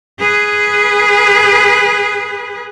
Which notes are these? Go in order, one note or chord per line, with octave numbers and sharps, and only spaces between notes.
G#4 B4